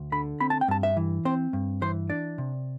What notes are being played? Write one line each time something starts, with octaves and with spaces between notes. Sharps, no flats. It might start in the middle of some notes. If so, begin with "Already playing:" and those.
Already playing: D2
D3 B5
C4 B5
A5
G5
G2 A5
E5
E3
C4 C5
G2
E3 C5
D4 D5
C3